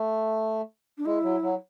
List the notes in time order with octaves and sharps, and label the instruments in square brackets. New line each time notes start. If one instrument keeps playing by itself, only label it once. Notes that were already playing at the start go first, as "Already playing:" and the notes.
Already playing: [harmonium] A3
[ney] D4
[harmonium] G#3 [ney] E4
[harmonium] F#3
F#3